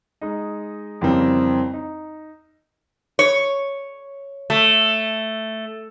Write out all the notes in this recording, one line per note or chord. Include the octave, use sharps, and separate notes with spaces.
G#3 D#4
F2 C#3 E3 G3 A#3 C4
D#4
C#5
A3